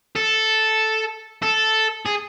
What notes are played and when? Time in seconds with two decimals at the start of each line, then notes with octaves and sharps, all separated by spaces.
0.15 A4
1.43 A4
2.06 G#4